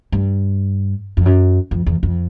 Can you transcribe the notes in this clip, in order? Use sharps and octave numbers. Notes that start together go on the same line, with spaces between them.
G2
F2
F#2
F2
E2
F2